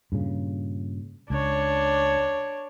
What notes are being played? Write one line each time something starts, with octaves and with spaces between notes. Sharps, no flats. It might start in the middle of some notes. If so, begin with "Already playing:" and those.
G2 A#2 C#3
C#2 D4 C#5